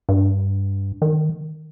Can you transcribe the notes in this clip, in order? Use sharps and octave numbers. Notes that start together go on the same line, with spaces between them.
G2
D#3